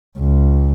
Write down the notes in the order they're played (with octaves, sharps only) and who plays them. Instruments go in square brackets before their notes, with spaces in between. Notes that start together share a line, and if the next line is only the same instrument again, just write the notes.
[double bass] C#2